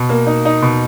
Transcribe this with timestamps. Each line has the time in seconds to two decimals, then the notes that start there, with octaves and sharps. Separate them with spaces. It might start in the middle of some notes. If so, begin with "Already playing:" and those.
Already playing: B2
0.09 A#3
0.26 D#4
0.45 D#4
0.62 B2